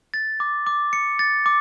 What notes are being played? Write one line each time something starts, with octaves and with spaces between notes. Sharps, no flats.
A6
D6
D6
C#7
A6
D6